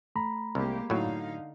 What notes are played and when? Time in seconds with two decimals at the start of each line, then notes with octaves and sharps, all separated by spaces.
0.16 A3 A#5 B5
0.55 C2 G#3 A#3 G4
0.90 A2 D3 F#3 D#4 F5